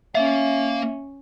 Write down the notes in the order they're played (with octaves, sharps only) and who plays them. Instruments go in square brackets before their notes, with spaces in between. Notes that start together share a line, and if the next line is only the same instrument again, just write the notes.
[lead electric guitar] A#3 F5 [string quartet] C#4 [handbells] E5